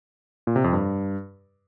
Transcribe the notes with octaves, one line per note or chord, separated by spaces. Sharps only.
A#2
C3
F2
G2